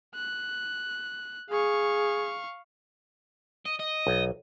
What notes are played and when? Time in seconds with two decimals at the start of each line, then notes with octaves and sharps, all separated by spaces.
0.15 F#6
1.50 G#4 F5 C#6
3.66 D#5
3.80 D#5
4.07 B1